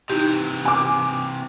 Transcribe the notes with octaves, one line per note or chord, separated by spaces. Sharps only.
C3 E3 D#4 E4 G4
G#5 D6